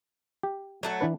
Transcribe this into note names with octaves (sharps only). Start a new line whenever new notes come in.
G4
F#3 A3 F#5
E3 D4 B4